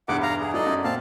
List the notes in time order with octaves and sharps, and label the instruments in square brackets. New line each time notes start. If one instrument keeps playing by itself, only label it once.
[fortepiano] B1 E2 G2 [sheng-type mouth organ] F#5 D6
[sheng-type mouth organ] F5 A#5
G#4
[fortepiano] F#3 D#4 [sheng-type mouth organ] A4 D5 D#5
[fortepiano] F#2
[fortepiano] A#2 [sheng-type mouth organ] C4 F5 A5